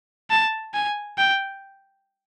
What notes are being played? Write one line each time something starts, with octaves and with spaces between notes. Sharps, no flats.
A5
G#5
G5